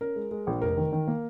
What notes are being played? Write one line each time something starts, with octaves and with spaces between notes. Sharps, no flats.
C#4 A#4
G#3
G#3
A#1
F1 A#4
D#3
D#3
A#3